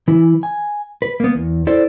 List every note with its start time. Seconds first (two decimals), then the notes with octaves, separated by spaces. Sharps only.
0.08 E3 E4
0.43 G#5
1.02 B4
1.20 A#3 B3
1.35 E2
1.67 E4 A4 C5 D5